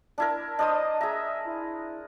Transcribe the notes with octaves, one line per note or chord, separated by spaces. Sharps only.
D4 E4 A#4
D4 C5 D#5 D#6
G#4 E5 A#5
E4